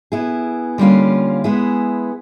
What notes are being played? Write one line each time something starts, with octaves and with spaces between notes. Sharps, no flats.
B3 E4 G#4
D3 G3 A#3 C#4 F4
G#3 B3 E4 G#4